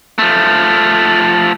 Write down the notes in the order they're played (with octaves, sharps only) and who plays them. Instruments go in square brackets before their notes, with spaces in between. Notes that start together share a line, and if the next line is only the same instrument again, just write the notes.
[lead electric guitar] F3 A3